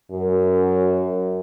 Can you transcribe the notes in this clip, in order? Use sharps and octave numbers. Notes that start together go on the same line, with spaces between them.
F#2